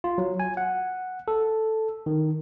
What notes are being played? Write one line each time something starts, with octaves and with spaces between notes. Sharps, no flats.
F4
F#3
G#5
F#5
A4
D#3